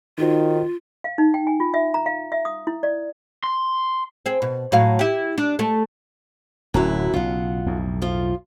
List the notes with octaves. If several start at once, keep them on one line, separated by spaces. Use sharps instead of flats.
D#3 D#4 F4 F#4 C5
F5
D#4
G5
G#5
F4
E5
A#5
F5
E5
D#6
E4
D5
C6
C4 G#4
B2
A2 F#3 F5
E4 G4
D4
A3 A4
D1 F#2 F#3 E4
B1 C#3 F4 F#5
B1 F2 A2
F3 F4